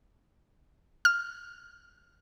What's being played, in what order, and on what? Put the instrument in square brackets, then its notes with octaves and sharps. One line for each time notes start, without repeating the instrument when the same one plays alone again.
[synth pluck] F6